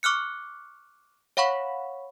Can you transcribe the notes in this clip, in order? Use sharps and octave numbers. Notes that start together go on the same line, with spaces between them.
C#6 D6 F6 F#6 C#7
C#5 F5 F#5 B5 C#6